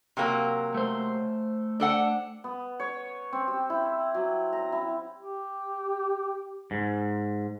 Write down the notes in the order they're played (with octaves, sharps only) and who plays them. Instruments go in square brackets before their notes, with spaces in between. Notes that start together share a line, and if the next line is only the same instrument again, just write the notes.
[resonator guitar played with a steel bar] C3 F#3 A#3
[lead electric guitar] A3 C5
[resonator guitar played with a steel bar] D4 A4 F#5
[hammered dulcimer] B3
C#5
C4
G4
E4
F#3
A#5
E4
[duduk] G4
[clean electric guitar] G#2